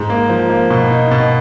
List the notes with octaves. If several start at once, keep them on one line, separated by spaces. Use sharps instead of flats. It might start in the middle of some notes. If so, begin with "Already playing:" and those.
Already playing: G#2
A#3
F3
A#3
B2
D#4
B2